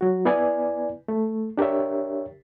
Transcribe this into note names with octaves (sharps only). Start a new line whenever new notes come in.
F#3 F#4
B3 E4 B4 D5 G#5
A3
D4 G4 A#4 C#5 E5